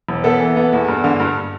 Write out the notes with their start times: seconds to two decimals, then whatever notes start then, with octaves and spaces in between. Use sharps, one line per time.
0.09 E1
0.24 B3 A4
0.40 E3
0.56 B3
0.73 E2
0.88 G2
1.04 D3
1.20 G2